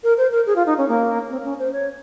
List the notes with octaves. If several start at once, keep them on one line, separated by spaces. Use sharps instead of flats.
A#4
C5
A#4
G#4
F4
D#4
C#4
A#3
C4
C4
C#4
C5
C#5